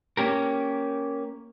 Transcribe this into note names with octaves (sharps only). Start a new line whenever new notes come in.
A#3 C#4 G4 A#4